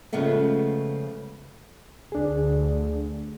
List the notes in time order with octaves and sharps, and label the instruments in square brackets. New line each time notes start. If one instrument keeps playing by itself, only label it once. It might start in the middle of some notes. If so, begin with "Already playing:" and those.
[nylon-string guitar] C#3 F3 G#3 A3 B3
[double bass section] D2 [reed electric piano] D4 G#4